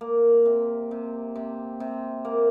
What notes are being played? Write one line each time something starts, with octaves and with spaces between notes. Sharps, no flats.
A#3
C3
C3
C3
C3
A#3